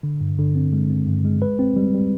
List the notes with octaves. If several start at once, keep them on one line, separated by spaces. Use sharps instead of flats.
D3
G2
D3
C4
G#3
C4
G2
G#3
B4
C4
G3
G3